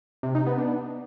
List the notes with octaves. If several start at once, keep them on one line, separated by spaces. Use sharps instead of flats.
C3
D#4
B3
D4